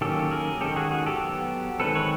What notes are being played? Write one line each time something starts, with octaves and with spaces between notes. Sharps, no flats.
D#3 F#3 A#3 C#4 G4 A4
G#4 A#4
D#3 G#3 C#4 G4 A4
F#4 G#4
F#4 G#4
G4 A4
F#3 B3
D#3 G#3 C4 A4 B4
B4 C#5